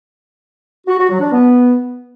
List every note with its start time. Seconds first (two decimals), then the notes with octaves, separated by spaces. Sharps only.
0.87 F#4
0.98 F#4
1.09 F#3
1.20 D4
1.31 B3